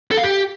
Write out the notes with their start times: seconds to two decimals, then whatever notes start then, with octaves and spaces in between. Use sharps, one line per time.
0.11 A4
0.17 F5
0.23 G4